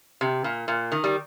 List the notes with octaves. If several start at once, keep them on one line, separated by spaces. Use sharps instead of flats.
C3
A#2
A#2
D#3
G3